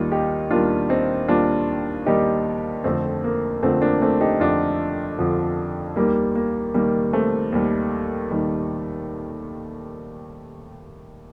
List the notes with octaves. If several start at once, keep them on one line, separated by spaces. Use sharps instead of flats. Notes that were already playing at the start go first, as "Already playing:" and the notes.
Already playing: D#2 D#3 G3 F4
D#4 G4
D#2 D#3 G3 D4 F4
C4 D#4
D#2 D#3 G3 D4 F4
D#2 D#3 G3 D#4 G4
F2 D3 F3 A3 C4
A#3
F2 D3 F3 A3 C4
A#3 D4
A3 C4
D#4 G4
F2 D3 F3 D4 F4
F2 D3 F3
D#2 D#3 G3 A#3
A#3
D#2 D#3 G3 A#3
A3 C4
D#2 D#3 G3
D#2 D#3 G3